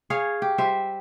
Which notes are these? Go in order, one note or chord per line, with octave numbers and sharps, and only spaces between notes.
G#4 C#5 F5
G4
G3 C5 E5